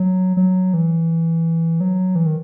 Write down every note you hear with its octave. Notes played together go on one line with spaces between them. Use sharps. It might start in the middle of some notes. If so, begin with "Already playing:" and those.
Already playing: F#3
F#3
E3
F#3
E3
D#3